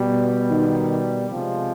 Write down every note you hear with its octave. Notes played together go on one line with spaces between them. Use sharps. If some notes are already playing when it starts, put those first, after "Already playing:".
Already playing: B2 G3
D#3 D#4
C3 F3 G#3